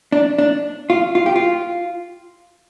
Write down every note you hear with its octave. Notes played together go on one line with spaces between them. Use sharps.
D4
D4
F4
F4
G4
F4